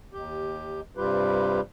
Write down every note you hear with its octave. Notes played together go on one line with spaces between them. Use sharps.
D#2 G4
G2 C3 G3 F4 G4 B4